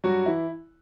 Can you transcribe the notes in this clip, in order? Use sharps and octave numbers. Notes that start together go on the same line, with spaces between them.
G2 F#3 F#4
E3 E4